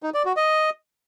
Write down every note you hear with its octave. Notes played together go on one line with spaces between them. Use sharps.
D#4
D5
F#4
D#5